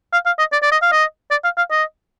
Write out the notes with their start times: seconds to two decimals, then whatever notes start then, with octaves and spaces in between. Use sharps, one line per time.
0.13 F5
0.26 F5
0.39 D#5
0.53 D5
0.63 D5
0.72 D#5
0.82 F5
0.92 D#5
1.31 D5
1.44 F5
1.57 F5
1.71 D#5